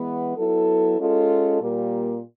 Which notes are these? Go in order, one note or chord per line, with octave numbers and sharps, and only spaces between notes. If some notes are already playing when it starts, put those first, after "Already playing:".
Already playing: E3 G#3 B3
F#3 B3 E4 A4
G#3 C#4 F4 A4
A#2 G3 A#3